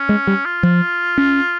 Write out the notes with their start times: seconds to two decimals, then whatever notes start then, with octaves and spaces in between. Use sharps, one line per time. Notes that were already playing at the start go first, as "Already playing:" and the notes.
Already playing: C#4
0.09 G#3
0.27 G3
0.45 F4
0.63 F3
1.18 C#4